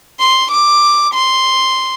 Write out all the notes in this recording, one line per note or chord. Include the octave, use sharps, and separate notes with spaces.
C6
D6
C6